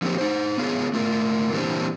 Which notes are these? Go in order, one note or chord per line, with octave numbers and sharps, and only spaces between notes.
D3 F3 F#3 A#3 C4 G4
D#4 C5
B3 C#4 F4 G#4
A3 F4 A#4
A#2 E3 G3 C4 D4